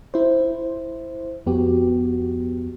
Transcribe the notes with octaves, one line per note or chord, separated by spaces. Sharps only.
E4 C5
F2 B3 F#4 G4